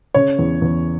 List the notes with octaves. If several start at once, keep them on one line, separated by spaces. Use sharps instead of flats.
C#3 C#5
E2
E2